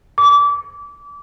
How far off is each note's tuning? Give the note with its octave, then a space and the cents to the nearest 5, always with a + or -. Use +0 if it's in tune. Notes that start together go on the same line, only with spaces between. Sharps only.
D6 -30